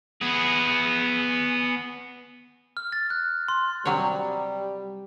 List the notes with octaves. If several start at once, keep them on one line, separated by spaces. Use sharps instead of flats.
B3 G#4
F6
A6
F#6
C6
C3 F#3 G3 C#5